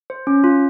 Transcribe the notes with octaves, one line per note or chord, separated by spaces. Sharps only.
C5
C#4
F4